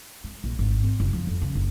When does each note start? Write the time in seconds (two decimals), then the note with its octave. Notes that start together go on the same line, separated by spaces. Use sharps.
0.24 G#3
0.44 A#1
0.59 G#1
0.83 C4
1.00 F#1
1.13 F3
1.27 F2
1.42 C#3
1.55 F#1